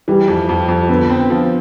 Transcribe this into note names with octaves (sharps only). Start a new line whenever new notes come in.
E3 G3
F2
F2
F2
D3 B3
C4
F3